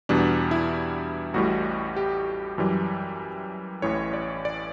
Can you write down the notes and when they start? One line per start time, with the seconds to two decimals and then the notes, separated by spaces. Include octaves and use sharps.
0.09 E2 B2 G3 D4
0.51 E4
1.34 A1 A2 G3 F#4
1.96 G4
2.58 F#2 E3 G3
3.82 A1 A2 E3 C#5
4.13 D5
4.45 D5